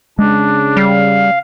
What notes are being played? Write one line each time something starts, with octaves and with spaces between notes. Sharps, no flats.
C#3 G#3 D4
G3 F5